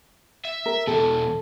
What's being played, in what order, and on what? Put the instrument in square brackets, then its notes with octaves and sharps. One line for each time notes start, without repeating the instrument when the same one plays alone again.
[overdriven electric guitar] E5
[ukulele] A#4
[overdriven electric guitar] E2 B2 [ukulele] A4